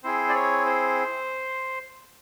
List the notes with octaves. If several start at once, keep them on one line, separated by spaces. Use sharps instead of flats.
C4 E4 G#4 C5
D5
C#5
C5